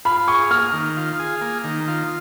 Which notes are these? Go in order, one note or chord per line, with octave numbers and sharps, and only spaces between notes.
F4 B5
G#4 C#6
A#3 F6
D#3
F4
G#4
A#3
D#3
F4